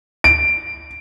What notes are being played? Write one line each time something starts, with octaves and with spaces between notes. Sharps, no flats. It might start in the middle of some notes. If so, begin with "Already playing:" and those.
D7